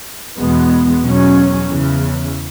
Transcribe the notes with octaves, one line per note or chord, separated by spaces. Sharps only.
E2 B2 G#3 B3
E2 B2 F#3 C#4
E2 C#3 E3